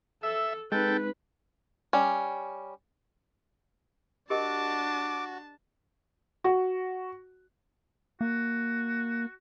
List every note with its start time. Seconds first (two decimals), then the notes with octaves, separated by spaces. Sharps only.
0.23 A4 E5
0.72 G#3 C4 D#4 G#4 A4 B4 G5
1.93 G3 C#4
4.30 D4 F#4 G4 A#4 D#5 A5 D6
6.44 F#4
8.21 A#3 F#4